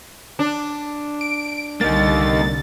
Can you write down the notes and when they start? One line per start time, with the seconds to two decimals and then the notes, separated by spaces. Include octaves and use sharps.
0.39 D4
1.21 D7
1.81 C2 D3 G3 A#3 D#4 A6